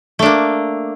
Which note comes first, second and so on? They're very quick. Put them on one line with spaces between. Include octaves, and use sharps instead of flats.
A3 D4 A#3